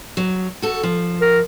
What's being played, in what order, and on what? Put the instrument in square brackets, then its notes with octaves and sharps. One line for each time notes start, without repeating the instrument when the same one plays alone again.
[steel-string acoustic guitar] F#3
F#4 A4
F3
[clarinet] A#4